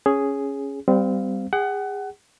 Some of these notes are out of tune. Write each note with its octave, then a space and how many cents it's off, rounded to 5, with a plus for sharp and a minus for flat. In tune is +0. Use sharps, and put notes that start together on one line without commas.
C#4 +0 G#4 +0
G3 +0 C4 -25 F5 +0
G#4 -30 F#5 +25